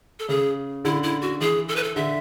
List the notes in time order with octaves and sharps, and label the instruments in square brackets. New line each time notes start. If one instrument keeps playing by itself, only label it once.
[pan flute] A4
[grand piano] C#3 [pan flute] G#4
[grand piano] D3 [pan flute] E4
[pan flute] E4
F#4
[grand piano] E3 [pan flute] G#4
[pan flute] A4
B4
A4
[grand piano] D3 [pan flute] E5